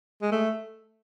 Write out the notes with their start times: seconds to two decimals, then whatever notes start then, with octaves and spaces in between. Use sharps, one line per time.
0.22 G#3
0.32 A3